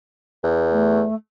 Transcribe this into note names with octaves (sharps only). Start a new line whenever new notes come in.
E2
A3